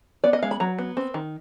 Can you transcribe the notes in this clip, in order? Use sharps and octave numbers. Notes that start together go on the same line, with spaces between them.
B3 D5
D#5
G#3 F5
B5
F#3 A#5
B3
C4
D#3